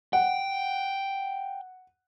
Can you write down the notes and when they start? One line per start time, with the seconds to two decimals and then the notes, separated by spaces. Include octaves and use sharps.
0.13 F#5 G5